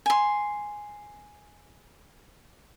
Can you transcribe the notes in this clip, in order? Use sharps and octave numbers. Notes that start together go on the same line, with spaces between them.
G#5 C6